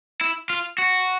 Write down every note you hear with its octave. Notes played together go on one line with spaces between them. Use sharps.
E4
F4
F#4